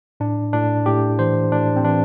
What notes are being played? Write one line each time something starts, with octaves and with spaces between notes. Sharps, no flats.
A2 D4
A2 D4
A2 G4
E3 C5
A2 D4
C4
E3 D4